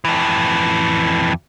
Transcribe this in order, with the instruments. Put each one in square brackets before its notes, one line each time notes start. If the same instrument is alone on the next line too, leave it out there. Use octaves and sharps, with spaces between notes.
[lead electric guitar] F2 E3